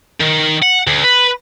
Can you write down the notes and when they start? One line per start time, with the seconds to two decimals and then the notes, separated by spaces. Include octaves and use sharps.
0.20 D#3
0.62 F#5
0.87 D2
1.04 B4